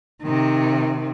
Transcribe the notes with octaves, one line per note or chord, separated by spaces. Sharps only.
C3 D#3